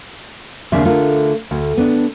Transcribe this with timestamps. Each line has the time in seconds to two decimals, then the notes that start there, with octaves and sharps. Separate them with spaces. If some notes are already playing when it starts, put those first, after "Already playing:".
0.72 D#2 C#3 C4 D4 E5
0.85 D3 A3 F4 A#4
1.51 D2
1.78 B3 D4